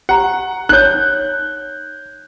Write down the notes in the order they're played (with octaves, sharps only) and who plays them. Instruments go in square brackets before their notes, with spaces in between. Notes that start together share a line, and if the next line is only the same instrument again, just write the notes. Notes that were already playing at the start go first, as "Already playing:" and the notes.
[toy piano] G4 A#5 [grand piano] F#5
[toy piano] D#4 C#5 [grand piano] F#6 G6